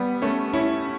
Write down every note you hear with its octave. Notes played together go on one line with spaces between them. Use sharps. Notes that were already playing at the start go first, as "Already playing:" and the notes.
Already playing: G3 B3
A3 C#4
C#4 E4